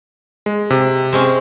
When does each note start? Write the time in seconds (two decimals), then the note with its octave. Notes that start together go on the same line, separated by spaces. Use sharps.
0.46 G#3
0.70 C3
1.13 G#3 C4 C#4